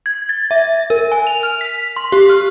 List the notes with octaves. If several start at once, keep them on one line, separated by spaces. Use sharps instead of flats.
G#6
A6
E5
A#4
G#5
F7
F6
B6
C6
G4
F6